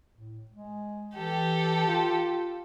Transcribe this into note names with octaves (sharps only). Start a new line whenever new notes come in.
A2
G#3
E3 G4 A4
F4